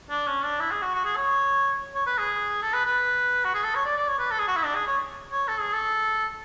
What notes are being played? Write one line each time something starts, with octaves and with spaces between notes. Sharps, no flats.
D4
C#4
D4
E4
G#4
F#4
F#4
G#4
C#5
C#5
B4
G#4
A4
B4
B4
F#4
G#4
A4
C#5
D5
D5
C#5
B4
A4
G#4
F#4
E4
D4
G#4
C#5
C#5
A4
G#4
A4